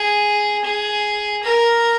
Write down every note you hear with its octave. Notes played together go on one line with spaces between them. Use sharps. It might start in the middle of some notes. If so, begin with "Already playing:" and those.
Already playing: G#4
G#4
A#4